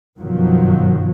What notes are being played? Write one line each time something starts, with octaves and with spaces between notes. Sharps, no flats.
G1 F#2 B2 D#3 F3 F#3